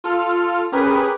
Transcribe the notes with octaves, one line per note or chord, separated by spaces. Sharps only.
F4 A4 F6
C#4 G4 G#4 A#4 B4